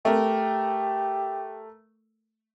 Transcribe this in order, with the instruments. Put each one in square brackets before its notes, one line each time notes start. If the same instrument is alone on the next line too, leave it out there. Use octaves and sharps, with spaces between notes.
[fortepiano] A3 A#4 [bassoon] G4